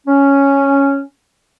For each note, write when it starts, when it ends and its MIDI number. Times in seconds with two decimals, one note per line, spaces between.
0.07 1.02 61